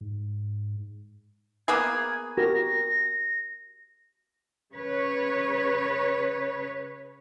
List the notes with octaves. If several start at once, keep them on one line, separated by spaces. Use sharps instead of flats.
G#2
A#3 B3 G#4 G#6
F#4 G4 A#4 A#6
C#3 B4 C#5